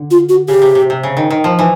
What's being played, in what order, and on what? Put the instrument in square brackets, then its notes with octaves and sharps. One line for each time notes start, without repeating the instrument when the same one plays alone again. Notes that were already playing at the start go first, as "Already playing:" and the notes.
Already playing: [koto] D3
[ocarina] F4
F#4
[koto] C#3 [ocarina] G4
[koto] C3
C3
C3
C#3
D#3
D#3
F3
E3